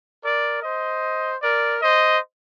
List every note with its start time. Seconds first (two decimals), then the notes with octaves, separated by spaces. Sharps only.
0.23 A#4 D5
0.63 C5 D#5
1.41 A#4 D5
1.81 C5 D#5